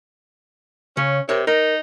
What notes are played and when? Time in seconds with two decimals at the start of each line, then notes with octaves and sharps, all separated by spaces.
0.97 C#3 C#4
1.29 C3 A#4 C#5
1.47 D#4 A#4